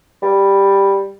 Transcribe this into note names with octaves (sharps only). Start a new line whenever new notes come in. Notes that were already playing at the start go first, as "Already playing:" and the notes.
G3